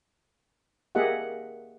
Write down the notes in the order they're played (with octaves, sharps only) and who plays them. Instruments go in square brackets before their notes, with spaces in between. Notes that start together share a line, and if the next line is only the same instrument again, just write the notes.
[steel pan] A#3 G4 G#4 D#5 E5 F#5